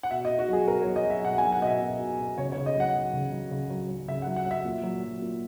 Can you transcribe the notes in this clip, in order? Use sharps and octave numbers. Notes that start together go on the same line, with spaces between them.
F#5
B2 E5
D#5
B2
F#4
F#3 G#4
B2 A#4
C#5
F#3
D#5
F#3 E5
B2 F#5
G#5
F#3
F#5
B2 D#5 E5
B2
B2
B2
C#3 C#5
C#5
C#3
D#5
F#3 F#5
F#3
C#3
F#3
C#3
F#3
F#3
C#3 E5
F#5
F#3
F#5
F#3 E5
A#2
F#3
F#3
A#2